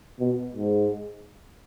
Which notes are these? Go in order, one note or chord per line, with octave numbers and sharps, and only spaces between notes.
B2
G#2